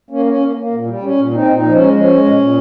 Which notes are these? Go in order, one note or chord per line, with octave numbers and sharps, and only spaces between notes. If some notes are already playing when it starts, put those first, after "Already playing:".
A#3 C#4
C#4
A#3
A#3
A#2
G3
C#4
A#2
C4 D#4
A#2 D#4
F3
C#4
G#3
F3 C#4
G#3
A#2
A#2